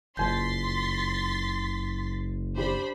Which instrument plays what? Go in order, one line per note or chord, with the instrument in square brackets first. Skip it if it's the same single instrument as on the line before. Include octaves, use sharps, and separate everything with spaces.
[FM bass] F#1 [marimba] F2 G6 [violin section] C6 A6 B6
[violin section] D4 C5 B5 [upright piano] G4